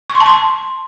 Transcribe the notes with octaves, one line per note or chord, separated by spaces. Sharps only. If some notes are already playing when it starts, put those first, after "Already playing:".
C#6
C6
A5
C6